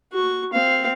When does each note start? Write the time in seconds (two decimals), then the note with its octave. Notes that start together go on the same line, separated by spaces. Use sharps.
0.13 F#4 C#6
0.53 C4 F5